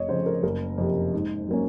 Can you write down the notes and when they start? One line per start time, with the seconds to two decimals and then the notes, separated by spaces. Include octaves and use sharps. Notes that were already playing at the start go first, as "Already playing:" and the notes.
Already playing: F1 C#5 D#5
0.08 F2 C#3 C5
0.26 A#4
0.43 F#1 A#4
0.78 F2 C3
1.13 G#2
1.48 F#3 A#3 C#4